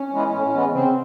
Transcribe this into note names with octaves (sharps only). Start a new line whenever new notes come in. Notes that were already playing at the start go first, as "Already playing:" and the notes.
Already playing: C#4
E3 G#3 B3
A2
E3 G#3 B3
C#3 C4